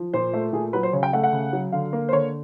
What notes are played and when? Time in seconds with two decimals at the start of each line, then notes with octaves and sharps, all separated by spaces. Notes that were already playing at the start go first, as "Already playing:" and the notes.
Already playing: F3
0.14 A#2 C5
0.34 A3
0.53 A#2 G#4
0.73 F#3 B4
0.83 C5
0.93 C#3 C#5
1.03 G5
1.13 A3 F#5
1.23 F#5
1.33 C#3
1.53 F#3
1.72 D3 F5
1.93 A#3
2.09 C5
2.13 D3 C#5